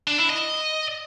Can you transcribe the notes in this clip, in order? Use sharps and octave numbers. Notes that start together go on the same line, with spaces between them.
D4
E4
D#5